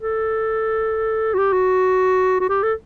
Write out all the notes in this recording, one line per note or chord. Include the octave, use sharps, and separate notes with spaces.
A4
F#4
G4
F#4
F#4
G4
A4